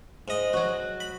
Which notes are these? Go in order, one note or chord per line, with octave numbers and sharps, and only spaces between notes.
G#2 D#5
F#3 F#4
B5